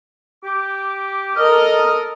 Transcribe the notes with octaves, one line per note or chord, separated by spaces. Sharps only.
G4 D6
A4 A#4 D#5 F6